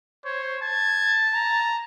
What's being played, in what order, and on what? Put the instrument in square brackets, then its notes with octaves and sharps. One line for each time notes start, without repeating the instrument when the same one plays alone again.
[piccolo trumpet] C5 [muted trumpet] C#5
[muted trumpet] A5 [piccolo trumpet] G#6
[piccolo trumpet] A#5